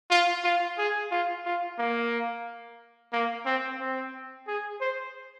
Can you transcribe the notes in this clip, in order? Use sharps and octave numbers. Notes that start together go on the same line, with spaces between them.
F4
F4
G#4
F4
F4
A#3
A#3
C4
C4
G#4
C5